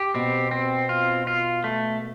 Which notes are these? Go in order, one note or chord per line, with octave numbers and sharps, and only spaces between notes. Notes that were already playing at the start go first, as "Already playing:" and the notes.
Already playing: G4
B2 C4
C4
F4
F4
A3